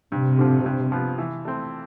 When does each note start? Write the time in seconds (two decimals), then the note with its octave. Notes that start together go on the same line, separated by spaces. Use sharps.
0.12 G2 C3
0.39 D3 F3
0.66 G2
0.92 F3 B3
1.18 E3
1.45 A3 C4